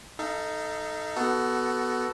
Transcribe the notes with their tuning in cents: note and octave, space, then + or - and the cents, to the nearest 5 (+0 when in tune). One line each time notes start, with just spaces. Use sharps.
D#4 +0 A4 +5 F5 -40
B3 +0 F#4 +20 A4 +0